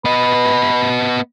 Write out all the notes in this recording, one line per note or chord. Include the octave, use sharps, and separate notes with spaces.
B3 B4 D#5